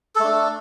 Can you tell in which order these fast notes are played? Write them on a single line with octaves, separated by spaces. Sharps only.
A4 A3 D4